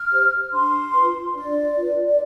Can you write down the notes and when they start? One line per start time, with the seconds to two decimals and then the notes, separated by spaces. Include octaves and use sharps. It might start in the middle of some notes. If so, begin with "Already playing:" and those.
Already playing: F6
0.11 G4 C5
0.53 D4 C6
0.93 F4 B4
1.34 D4 D5
1.76 F4 B4
2.07 D5